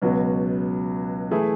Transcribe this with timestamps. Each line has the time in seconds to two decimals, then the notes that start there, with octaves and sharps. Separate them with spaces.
0.02 C#2 B2 F#3
1.31 E3 A3 E4 G#4